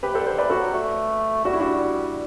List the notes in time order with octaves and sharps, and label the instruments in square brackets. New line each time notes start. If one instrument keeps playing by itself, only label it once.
[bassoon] C3 [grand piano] G4 B4
[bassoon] C3 [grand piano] A4 C5
[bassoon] D3
[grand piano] A4 C5
[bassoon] E3 [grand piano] B4 D5
[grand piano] F#4 A4
[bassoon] F#3
A3
[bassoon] G3 [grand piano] F#4
[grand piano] E4
D4 F#4